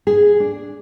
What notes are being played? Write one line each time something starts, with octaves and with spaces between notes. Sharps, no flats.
G#4
D4